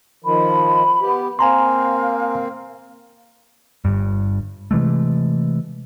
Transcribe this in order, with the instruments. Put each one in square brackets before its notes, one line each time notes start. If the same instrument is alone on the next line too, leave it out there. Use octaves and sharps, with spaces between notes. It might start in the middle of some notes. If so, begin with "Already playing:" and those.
[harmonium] D#3 F3 [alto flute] B5
[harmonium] B3 G4
[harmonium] A#3 C4 [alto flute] F5 [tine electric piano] G#5 A#5 C6
[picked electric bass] G1 G2
C3 E3 G#3 A3